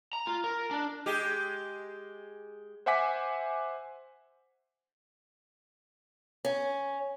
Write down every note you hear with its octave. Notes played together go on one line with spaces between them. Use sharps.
A#5
F4
A#4
D4
G#3 G4
C5 E5 F#5 G#5 D6 B6
C#4